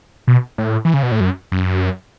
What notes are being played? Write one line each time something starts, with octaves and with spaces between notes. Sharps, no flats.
B2
A2
E3
C#3
B2
A2
F#2
F#2